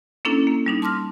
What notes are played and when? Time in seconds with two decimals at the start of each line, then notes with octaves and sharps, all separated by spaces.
0.25 A#3 C#4 D4 E4 A4
0.47 A#3
0.66 G3 D4 D#4
0.82 A5 C6 D6 F6 A#6